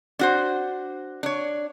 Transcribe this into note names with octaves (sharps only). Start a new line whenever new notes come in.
D4 F#4 C5
D4 C#5